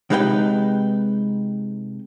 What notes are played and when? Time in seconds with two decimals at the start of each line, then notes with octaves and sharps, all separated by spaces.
0.10 C3 G#3 D#4 B4 F5 G5